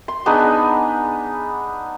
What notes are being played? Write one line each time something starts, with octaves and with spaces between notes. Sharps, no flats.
C6
B3 D4 D#4 G#4